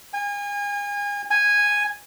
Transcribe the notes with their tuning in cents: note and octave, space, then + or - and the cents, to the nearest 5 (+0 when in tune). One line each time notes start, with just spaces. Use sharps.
G#5 -35
G#5 -10